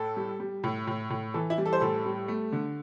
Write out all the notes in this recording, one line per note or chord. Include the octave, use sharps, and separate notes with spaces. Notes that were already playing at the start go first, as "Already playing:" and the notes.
Already playing: A2 A4
G3
G3
A2
A2
A2
E3 A4
E4
G3
A4
C5
A2 A4
G3
A3
D3